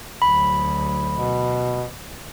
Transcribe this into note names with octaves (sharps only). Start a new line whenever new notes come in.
D2 F#3 B5
B2